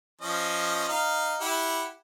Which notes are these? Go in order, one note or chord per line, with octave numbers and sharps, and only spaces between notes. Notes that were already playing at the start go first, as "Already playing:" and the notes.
F3 C#4 D#5
D#4 F5
E4 G4 F#5